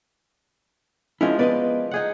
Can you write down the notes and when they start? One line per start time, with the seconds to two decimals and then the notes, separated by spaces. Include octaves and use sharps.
1.21 F3 G#3 C#4 E4 A#4
1.39 B3 B4 D5 D#5
1.91 D#4 G#4 F#5